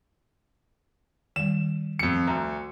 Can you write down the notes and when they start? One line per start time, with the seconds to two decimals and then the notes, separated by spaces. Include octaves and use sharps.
1.36 D#3 G3 E7
1.99 F2 C#7
2.27 D2 A#5